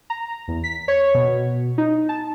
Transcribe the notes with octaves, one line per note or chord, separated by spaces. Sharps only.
A#5
E2
B6
C#5
B2
D#4
A5